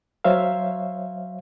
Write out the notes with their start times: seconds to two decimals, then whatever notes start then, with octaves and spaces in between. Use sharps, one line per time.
0.24 F#3 C5 C#5 E5 F5